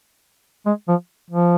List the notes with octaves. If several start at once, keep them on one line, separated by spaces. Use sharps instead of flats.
G#3
F3
F3